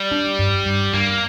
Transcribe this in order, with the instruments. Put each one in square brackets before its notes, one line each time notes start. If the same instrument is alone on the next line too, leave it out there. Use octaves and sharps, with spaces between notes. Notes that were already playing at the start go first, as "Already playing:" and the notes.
Already playing: [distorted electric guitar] G3
[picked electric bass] D4
G2
G2
[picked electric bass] G2 [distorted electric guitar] A#3